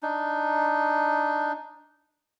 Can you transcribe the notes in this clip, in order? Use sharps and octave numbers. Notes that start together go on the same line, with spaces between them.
D4 D#4